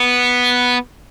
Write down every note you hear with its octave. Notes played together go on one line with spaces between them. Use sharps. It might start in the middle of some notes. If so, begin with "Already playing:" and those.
Already playing: B3